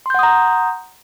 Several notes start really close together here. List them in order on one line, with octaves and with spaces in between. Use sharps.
C6 G6 F#5 D#6 A#5